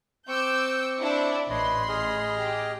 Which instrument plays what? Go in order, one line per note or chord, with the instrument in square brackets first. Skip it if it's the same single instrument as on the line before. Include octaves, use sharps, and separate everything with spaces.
[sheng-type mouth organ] C4 C#6 [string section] D6 E6 G6
[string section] D4 E4
[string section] A1 B5 C6 [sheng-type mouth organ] B4 C#5 D#5
[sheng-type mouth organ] G#4 D#5 F6
[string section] G4